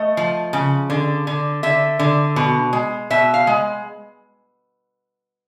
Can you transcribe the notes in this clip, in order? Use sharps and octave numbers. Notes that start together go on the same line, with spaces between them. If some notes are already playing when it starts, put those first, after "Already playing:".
Already playing: A3 D#5
F3
C#3
D3
D3
D3 E5
D3
B2
G#3
B2 E5
F5
G#3